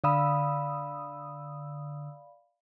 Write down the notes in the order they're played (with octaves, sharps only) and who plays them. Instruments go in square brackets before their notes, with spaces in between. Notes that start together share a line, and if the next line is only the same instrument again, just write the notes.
[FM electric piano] D3 D#6 E6 [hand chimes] D5 F5 B5